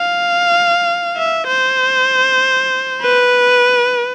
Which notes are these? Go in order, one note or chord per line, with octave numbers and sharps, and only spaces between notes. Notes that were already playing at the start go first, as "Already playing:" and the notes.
Already playing: F5
E5
C5
B4